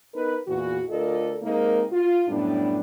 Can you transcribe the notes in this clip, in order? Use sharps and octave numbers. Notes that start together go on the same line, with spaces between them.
B3 D#4 A#4 B4
E2 A#2 E3 F#4
D2 F4 A4 A#4 D5 D#5
C3 G#3 A#3 D#4 A#4
F4
F#2 A2 G3 B3 D4